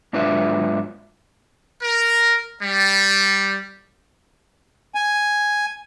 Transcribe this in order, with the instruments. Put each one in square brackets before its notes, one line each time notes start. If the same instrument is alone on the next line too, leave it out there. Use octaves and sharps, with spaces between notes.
[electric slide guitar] G#2 F#3 D4 F4 B4 E5
[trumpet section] A#4
G3
[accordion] G#5